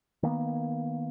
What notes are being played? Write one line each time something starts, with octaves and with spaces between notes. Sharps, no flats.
D#3 A#3 B3